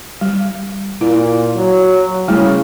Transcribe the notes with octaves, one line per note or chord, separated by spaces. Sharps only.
G3
A#2 E4
F#3
C#3 G3 A3 E4